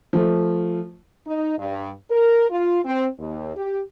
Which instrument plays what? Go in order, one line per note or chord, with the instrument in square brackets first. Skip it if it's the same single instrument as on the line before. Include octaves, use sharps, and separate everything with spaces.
[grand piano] F3 A3
[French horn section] D#4
G2
A#4
F4
C4
D#2
G4